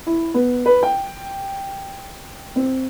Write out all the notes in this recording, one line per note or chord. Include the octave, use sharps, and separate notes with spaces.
E4
B3
B4
G5
C4